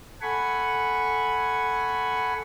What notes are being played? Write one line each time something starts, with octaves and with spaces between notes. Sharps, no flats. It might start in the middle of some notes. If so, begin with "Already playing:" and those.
A4 F#5 G#5 B5 C#6